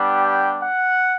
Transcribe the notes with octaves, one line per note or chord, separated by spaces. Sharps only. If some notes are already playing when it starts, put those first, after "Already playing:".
Already playing: G3 B3 D4 G4
G5
F#5